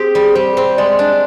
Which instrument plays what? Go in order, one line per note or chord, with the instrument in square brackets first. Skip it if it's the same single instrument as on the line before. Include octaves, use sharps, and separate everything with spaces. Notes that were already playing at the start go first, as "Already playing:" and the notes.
Already playing: [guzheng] C4 G4 [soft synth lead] G#4
[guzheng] G3
[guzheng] G3 [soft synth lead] C5
[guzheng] C4
[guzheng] G#3 [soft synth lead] D5
[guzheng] D4